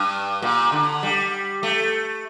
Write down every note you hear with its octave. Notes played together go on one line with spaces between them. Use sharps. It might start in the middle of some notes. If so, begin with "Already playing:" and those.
Already playing: G2
A#2
D3
G3
A3